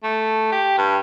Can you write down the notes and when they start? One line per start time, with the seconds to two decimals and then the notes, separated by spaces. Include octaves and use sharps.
0.03 A3
0.52 G4
0.78 G2